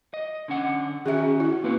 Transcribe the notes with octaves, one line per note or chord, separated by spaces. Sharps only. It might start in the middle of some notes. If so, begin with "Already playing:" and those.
D#5
D3 C#4 F#5
D#3 C#4 F#4 G#4 E5
E4
A#3 C4 F#4 B4